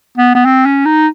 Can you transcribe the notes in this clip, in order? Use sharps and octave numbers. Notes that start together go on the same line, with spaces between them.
B3
B3
C4
C#4
D#4